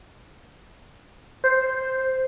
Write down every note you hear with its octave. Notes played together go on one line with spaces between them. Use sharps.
C5